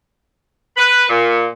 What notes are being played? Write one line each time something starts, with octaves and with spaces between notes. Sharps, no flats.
B4
A#2